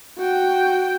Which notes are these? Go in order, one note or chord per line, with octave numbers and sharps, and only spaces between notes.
F#4 G5